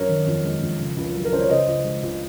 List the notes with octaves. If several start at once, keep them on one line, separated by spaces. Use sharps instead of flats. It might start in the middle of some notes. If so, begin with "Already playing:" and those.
Already playing: F#2 A#4 C#5
D#3
F2
G#3
F2
C#3
C#2
F#3
A#4
C#2 C5
C#5
C#3 C5 D#5
C#2
G#3
C#2